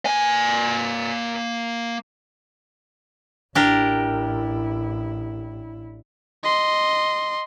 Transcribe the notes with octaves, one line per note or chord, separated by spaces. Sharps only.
A#3 G#5
A1 D4 E4 G4 A#4
D#5 C6